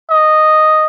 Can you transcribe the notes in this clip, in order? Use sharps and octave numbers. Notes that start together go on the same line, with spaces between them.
D#5